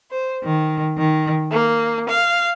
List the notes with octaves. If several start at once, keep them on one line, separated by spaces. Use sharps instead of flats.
C5
D#3
D#3
A#3
F5